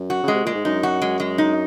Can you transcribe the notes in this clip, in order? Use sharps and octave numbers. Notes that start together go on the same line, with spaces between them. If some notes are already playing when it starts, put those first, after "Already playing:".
Already playing: F#2
F#4
C#3 G#3
C3
A#2 G#3
G#2
F#2 D#4
F#4
G#3
G#3
D#4